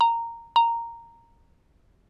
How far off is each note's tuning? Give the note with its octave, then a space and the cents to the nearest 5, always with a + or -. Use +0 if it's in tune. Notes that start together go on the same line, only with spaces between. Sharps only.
A#5 -10
A#5 -5